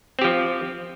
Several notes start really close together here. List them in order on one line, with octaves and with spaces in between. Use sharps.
C4 G4 F3